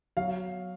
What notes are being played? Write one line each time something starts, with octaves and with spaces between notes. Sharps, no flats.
F#3 F5